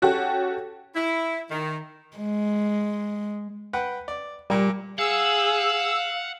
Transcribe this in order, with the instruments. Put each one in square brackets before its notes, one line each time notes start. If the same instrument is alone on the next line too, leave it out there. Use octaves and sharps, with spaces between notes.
[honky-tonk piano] C#4 F#4 G4 A4
[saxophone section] E4
D#3
[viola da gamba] G#3
[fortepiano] B4 F#5 G5
D5
[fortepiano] A#2 A#3 [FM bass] G3
[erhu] G#4 [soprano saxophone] F5 [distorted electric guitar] F#5 [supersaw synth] E6